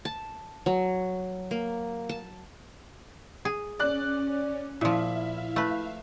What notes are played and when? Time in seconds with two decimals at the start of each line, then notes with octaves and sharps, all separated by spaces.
0.05 A5
0.66 F#3
1.51 A#3
2.09 A5
3.45 G#4
3.79 C#4 D5 F#6
4.81 A#2 F3 E4 E5 F5
5.56 A3 B4